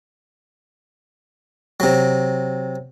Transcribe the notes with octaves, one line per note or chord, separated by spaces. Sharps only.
C3 F#3